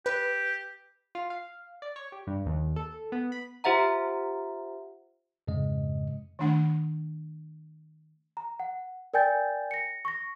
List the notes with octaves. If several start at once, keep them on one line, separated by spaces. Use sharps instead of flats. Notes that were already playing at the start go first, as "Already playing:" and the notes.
G4 B4
F4
F5
D5
C#5
G4
G2
D#2
A4
B3
B5
F4 G4 C5 E5 F#5 A#5
F2 G#2 C#3 G#3 D#5
D#3 A3 D4 F#5
A#5
F#5
A#4 D5 G5 G#5 G6 A6
A#6 C#7
C#6 A#6